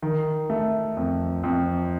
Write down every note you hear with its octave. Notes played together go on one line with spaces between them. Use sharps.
D#3
A3
F2
F2